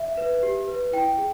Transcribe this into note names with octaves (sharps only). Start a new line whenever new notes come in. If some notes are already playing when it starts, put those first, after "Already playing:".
Already playing: E5
B4
G4
B4
E4 G5
G#4